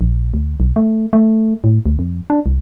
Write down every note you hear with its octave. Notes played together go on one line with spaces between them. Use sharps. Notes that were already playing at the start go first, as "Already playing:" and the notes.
A#1
D2
B1
A3
A3
A2
D2
F2
D4
C2